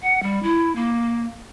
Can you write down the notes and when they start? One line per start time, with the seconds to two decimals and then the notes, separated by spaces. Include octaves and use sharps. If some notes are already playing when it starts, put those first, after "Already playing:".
0.02 F#5
0.23 G3
0.43 E4
0.76 A#3